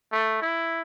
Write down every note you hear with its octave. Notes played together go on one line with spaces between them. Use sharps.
A3
E4